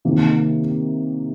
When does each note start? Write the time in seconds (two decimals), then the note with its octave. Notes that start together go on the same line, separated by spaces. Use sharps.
0.05 C3 D#3 A#3